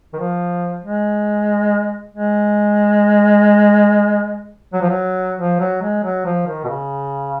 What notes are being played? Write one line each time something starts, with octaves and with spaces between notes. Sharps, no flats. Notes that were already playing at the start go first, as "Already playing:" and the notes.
D#3
F3
G#3
G#3
F#3
F3
F#3
F3
F#3
G#3
F#3
F3
D#3
B2
C#3